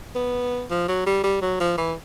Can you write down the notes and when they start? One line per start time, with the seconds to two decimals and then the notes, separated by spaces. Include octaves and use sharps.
0.15 B3
0.70 F3
0.88 F#3
1.06 G3
1.23 G3
1.41 F#3
1.60 F3
1.77 E3